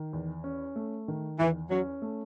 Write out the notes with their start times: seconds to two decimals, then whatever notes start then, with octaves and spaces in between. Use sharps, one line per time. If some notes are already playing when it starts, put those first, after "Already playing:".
Already playing: D#3
0.13 E2
0.44 C#4
0.76 A3
1.08 D#3
1.39 E2 E3
1.70 F#3 C#4
2.02 A3